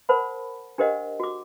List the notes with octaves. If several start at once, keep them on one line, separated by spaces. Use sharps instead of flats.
A#4 C5 F#5 A5 B5
D4 G4 A#4 C5 D#5 F#5
F#4 D6